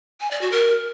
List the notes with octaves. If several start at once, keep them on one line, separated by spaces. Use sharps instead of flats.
G#5
D5
F#4
A#4